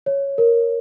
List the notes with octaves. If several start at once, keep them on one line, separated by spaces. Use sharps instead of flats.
C#5
A#4